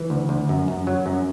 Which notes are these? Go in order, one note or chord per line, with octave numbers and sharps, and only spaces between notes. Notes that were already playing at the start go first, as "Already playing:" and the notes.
Already playing: E3
D2
D2
F#2
F#2
F#3
F#2